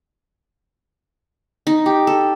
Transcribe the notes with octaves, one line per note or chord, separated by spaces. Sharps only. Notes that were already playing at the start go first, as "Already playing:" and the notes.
D#4
G4
A4